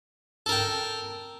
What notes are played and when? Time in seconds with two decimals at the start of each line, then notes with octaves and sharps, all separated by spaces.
0.46 A4
0.49 A#4
0.52 G5